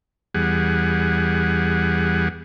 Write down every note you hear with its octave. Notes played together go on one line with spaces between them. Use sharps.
E2 G3 G#4 F#5